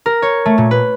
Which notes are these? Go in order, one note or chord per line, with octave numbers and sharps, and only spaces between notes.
A#4
C#5
A3
A#2
B4